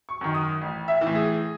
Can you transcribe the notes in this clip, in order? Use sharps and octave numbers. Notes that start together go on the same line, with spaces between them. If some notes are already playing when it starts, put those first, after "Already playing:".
C#6
F#2 D#3
D#6
A1
E5
E3
A2
G#4